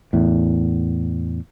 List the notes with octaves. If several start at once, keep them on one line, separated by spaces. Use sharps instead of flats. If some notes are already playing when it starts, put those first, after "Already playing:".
E2 A2